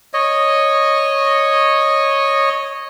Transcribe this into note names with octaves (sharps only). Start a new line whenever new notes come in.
C#5 D#5